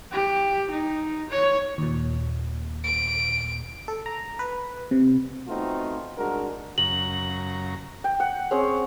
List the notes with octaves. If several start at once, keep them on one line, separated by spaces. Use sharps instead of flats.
G4
D#4
C#5
D#2 A#2
D7
A4
A#5
B4
C3
A3 B3 C4 D#4 F4 F#4
C2 G#3 D4 F#4 A#4
F#2 C#3 A#5 F#7
G5
F#5
C4 C#4 G#4 C#5